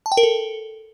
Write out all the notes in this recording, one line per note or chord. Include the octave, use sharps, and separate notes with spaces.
A5
G5
A#4
A4